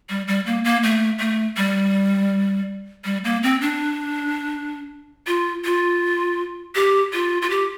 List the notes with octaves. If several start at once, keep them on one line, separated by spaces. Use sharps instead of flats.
G3
G3
A#3
A#3
A3
A3
G3
G3
A#3
C4
D4
F4
F4
G4
F4
F4
G4